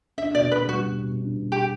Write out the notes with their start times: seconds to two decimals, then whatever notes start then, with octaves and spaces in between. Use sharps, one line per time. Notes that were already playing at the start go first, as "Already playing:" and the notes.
0.18 D4 E5
0.34 B2 D5
0.51 B2 B4
0.68 G3 F#4
0.84 B2
1.02 B2
1.19 D4
1.36 B2
1.52 G4